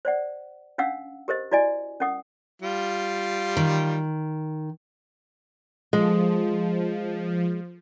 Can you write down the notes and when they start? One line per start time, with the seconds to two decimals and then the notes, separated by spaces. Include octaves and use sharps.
0.05 C5 D5 F#5
0.78 C#4 D4 F5 F#5 E6
1.28 G4 A#4 C5 D#5
1.51 E4 F#4 D5 D#5 G#5
2.00 C#4 A#4 F#5 D#6
2.62 G3 F4
3.57 D#3
5.93 F3 G#3